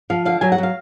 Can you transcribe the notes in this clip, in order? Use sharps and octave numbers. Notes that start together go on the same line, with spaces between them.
F3 F5
D3 F5
F#3 G#5
F#5
F#3
F5